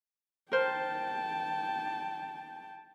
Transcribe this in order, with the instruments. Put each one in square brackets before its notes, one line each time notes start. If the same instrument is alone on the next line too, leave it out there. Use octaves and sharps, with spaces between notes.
[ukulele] A#4 C5 [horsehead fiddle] G5 A5